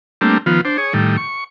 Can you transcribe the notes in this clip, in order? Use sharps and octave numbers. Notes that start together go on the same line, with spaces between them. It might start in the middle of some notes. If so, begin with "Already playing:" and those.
G3 A3 A#3 C4 D4
D#3 F3 B3 F4
D4 C5
G#4 C#5
A2 D#3 G3
C#6